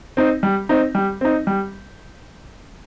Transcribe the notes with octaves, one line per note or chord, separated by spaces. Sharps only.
C4 D#4
G3
C4 D#4
G3
C4 D#4
G3